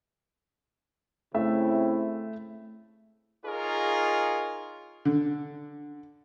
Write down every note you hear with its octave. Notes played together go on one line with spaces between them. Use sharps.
C#3 A3 C4 E4 E5
D#4 F4 G#4 A#4 C#5
D3